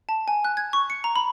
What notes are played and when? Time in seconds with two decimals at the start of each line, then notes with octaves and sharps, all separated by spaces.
0.09 A5
0.28 G#5
0.45 F#6
0.57 G#6
0.73 C#6
0.90 C#7
1.04 A#5
1.16 B5